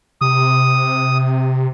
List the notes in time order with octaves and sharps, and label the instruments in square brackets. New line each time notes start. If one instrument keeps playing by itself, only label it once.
[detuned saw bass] C3 [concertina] D#6